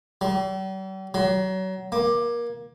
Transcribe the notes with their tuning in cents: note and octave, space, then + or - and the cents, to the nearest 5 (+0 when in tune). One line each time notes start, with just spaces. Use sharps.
G3 -45
F#3 +30
A#3 +25